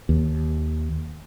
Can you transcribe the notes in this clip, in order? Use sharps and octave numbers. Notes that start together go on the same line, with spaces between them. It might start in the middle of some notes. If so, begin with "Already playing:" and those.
D#2